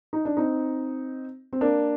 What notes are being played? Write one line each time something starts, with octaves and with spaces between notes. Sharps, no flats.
D#4
D4
C4 D#4
C4
A#3 D4